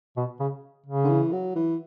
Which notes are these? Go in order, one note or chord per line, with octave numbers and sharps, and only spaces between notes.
B2
C#3
C#3
D3
E3
F#3
E3